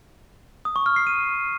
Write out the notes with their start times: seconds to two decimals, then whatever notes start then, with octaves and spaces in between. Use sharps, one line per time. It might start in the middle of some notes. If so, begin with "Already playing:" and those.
0.65 D#6
0.76 C#6
0.86 F6
0.96 C7
1.07 D#7